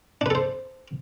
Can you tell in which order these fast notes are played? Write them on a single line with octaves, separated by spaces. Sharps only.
D4 B4 A4 C5